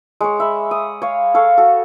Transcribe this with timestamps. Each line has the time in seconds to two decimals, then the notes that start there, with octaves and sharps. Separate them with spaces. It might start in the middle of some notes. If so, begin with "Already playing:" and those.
0.21 G#3 C#5
0.40 E5 B5
0.71 D#6
1.02 C#5 F5
1.34 A4 C#5 F5
1.58 F#4 A4